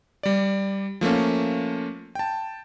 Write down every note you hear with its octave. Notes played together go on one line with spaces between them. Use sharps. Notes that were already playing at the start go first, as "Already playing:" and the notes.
G3 D5
F3 A3 A#3 C#4
G5 A5